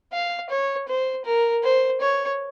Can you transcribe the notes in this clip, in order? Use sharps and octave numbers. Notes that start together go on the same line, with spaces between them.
F5
C#5
C5
A#4
C5
C#5